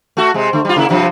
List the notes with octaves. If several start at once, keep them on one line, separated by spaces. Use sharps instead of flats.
A3 F#4
C3 G#3
D3 A3
G3 F4
C#3 A#3 E4
G2 C3 F3